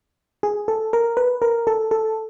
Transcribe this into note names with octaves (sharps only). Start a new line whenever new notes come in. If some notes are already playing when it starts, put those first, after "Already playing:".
G#4
A4
A#4
B4
A#4
A4
A4